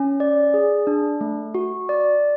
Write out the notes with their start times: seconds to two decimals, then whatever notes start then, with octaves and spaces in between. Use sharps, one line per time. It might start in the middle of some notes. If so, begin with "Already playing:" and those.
Already playing: C#4
0.20 D5
0.54 G#4
0.87 D4
1.21 A3
1.55 F#4
1.89 D5